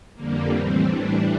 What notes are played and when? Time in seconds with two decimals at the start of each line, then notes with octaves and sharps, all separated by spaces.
0.14 F2 D3 G3 A#3
0.49 A2 E3 G3 C4
0.84 A2 E3 G3 D4